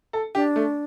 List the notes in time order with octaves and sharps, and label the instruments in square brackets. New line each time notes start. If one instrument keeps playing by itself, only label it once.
[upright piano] A4
[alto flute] D4 [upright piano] G4
[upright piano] A3